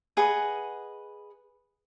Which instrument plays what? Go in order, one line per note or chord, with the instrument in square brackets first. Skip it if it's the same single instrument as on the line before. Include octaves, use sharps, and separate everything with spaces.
[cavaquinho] G#4 B4 D#5 F#5